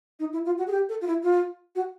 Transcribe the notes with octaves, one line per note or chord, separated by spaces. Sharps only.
D#4
E4
F4
F#4
G#4
G4
A4
F4
E4
F4
F#4